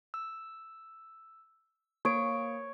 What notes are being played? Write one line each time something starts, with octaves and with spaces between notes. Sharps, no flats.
E6
A#3 C#5 D7